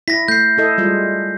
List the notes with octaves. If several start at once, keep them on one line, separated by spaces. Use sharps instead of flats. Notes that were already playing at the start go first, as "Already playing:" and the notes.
E4 A#6 B6
A3 G6 C7
E4 A4 D#5
G3 G#3 F4